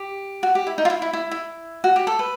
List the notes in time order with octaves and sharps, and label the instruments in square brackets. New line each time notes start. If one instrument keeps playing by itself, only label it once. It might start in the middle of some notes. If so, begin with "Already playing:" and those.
Already playing: [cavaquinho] G4
F#4
G4
E4
D#4
F4
E4
E4
E4
E4
F#4
G4
A4
B4